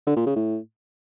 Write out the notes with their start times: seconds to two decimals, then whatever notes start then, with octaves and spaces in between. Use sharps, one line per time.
0.07 D3
0.17 A#2
0.26 C#3
0.36 A2